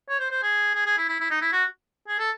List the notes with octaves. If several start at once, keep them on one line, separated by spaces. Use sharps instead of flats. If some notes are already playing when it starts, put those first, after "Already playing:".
C#5
C5
C5
G#4
G#4
G#4
E4
E4
E4
D#4
E4
F#4
G#4
A4